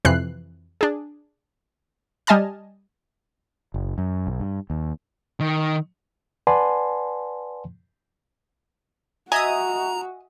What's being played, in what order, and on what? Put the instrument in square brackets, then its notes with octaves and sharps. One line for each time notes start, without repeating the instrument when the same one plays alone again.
[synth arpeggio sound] F2 C3 E3 F#6 C7
D4 G#4
G3 D#5 G#5 A5 F6
[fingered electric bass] F#1
F#2
B1
G2
D#2
[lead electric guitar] D#3
[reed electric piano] B4 D5 F#5 G#5 A5 C6
[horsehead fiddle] F#4 [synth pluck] D#5 E5 D#6 [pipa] G#5 [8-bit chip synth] A#5